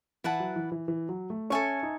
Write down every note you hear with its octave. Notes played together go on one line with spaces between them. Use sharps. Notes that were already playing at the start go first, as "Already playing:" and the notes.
E3 E4 B4 F#5 A5
F#3
E3
E3
E3
F#3
A3
C#4 A4 E5 G#5 C#6
D#4